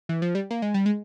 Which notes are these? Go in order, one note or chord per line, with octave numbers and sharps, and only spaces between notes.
E3
F3
G3
A#3
G#3
G3
G#3